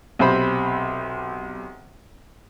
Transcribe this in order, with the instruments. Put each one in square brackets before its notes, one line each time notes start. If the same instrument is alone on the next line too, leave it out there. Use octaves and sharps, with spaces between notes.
[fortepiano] B1 C3 C5 B5